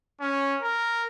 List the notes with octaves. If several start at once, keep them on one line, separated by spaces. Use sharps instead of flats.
C#4
A#4